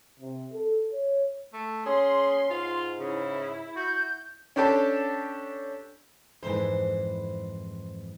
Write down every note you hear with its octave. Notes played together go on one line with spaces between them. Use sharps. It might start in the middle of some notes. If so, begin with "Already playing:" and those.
C3
A4
C#5
A3
C#4 G#4 C6
G#2 F4
C#3 E4
F#4 G6
C#4 D4 G4 A4 A5
F2 G#2 E3 C5